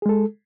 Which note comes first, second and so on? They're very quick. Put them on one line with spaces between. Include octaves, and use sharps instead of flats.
G#4 G#3 A4